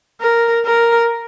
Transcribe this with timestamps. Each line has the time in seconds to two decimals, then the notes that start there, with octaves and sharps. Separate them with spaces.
0.21 A#4
0.66 A#4